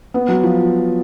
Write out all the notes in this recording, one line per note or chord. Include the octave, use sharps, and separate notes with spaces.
B3
F#3
F3